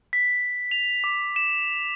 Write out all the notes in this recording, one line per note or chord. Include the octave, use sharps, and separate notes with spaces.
B6
F7
D6
E7